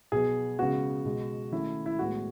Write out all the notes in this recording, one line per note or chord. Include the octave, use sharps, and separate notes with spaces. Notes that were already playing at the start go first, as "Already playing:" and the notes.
B2 F#3 B3 G#4
C#3 G#3 B3 F#4
B2 G#3 B3
D#3 A3 C#4 E4
E4
A2 G#3 B3 F#4